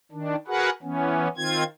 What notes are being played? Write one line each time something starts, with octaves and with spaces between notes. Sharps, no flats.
D#3 D4
F#4 G#4 A#4 B4 F#5
E3 B3 C#4
D#3 C4 F4 G#6